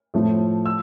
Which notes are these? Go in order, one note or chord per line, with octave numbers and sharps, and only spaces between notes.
A2 F3 A3
E6